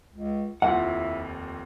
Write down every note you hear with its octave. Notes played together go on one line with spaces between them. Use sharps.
C#2
F1 D#2 F3 E4 F#5